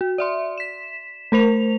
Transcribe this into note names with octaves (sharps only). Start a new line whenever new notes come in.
F#4
D5 E5 C6
B6 E7
A3 A#4 C5 F7